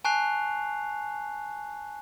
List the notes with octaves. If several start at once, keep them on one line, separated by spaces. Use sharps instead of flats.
G#5 A5 C#6 F#6 C7 F7